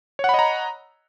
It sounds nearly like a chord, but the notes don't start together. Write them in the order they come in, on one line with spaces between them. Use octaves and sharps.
C#5 F#5 B5 D#5 A#5